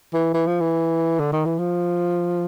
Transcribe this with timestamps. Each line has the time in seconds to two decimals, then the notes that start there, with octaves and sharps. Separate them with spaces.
0.13 E3
0.34 E3
0.47 F3
0.60 E3
1.19 D3
1.33 D#3
1.45 E3
1.59 F3